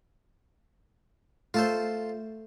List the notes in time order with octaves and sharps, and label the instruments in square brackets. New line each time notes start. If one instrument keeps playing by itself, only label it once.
[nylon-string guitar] A3 [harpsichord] F4 A4 C5